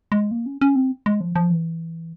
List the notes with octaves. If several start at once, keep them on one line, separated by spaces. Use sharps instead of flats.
G#3
A#3
C#4
C#4
C4
G#3
F3
F3
E3